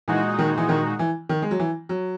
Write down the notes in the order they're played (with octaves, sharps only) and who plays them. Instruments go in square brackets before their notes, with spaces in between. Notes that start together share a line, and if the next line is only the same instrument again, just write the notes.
[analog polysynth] A#2 G#3 D#4 F#4 [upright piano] E3
[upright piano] D#3
E3
D#3
E3
D#3
G#3
F#3
E3
F#3